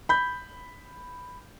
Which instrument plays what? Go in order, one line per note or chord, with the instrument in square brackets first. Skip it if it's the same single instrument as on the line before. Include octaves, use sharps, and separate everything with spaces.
[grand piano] B5 G6